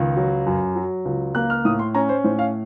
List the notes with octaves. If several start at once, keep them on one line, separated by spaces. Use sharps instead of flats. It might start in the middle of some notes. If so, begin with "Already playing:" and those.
Already playing: C#2 D#3
F#3
F#2
F#3
C#2
A#3 F#6
F6
A2 D#6
C6
C#4 A#5
C5
A2 C5
F5